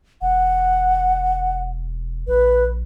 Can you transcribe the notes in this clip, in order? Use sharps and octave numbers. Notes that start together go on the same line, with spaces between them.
E1 F#5
A#1 B4